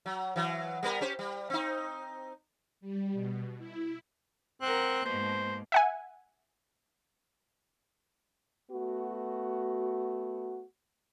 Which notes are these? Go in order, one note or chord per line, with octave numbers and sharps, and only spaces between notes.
F#3
E3 F#3
G3 B3 A#4
C#4 G4 C5
G3
C4 D#4
G3
B2
E4
C4 A#4 F#5 F#6
G#2 B2 A#3 C5
E5 F#5 G#5
A3 B3 F#4